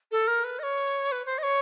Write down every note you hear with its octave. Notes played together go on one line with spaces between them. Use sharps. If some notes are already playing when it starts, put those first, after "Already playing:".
A4
A#4
B4
D#5
C#5
B4
C5
D#5
C#5